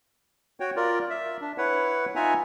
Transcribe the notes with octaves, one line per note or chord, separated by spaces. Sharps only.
F#4 C#5 G5
F4 A#4 D5
E5
D4
E4 B4 C#5 F#5
D#4 F4 E5 F#5 G#5 A#5